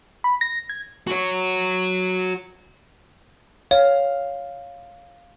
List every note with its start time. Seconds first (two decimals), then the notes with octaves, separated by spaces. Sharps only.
0.24 B5
0.41 A#6
0.69 G#6
1.07 F#4 C#5
3.71 C#5 F5